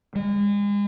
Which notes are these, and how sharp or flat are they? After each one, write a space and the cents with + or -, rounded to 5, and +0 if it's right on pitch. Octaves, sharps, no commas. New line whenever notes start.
G#3 -35